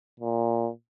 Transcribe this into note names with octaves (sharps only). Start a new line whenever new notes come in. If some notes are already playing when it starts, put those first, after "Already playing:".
A#2